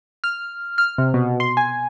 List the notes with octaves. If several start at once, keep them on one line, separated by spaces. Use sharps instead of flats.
F6
F6
C3
B2
C6
G#5